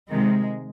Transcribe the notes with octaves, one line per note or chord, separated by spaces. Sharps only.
C3 D#3 G#3